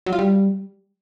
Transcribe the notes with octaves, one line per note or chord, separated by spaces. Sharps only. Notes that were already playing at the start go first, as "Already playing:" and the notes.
F#3
F4
G3